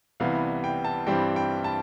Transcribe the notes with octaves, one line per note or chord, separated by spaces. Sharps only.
C2 C3 E3 G3 B3 F5
G5
A5
G2 E3 G3 C4 G5
G5
A5